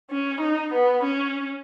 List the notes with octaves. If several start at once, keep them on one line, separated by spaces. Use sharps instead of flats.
C#4
D#4
B3
C#4